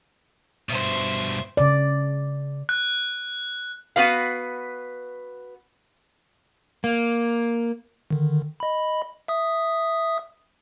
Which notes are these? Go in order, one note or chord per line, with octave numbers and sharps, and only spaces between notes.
G2 B2 C5 E5
C#3 D5
F#6
B3 F#4 B4 F5
A#3
D3 D#3
D#5 B5
E5 D#6